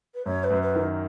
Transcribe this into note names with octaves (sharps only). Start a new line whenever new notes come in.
B4
F#2 C#5
B4
F#2
B4
D#3